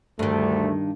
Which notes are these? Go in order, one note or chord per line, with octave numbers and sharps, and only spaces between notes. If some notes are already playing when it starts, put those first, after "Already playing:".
D2 G2 D#3 A3